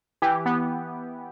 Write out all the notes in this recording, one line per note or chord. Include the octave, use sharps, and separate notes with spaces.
E3 G4
B3